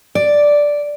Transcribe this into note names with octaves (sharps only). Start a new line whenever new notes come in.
D5